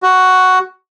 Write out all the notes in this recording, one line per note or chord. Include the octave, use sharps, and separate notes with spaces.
F#4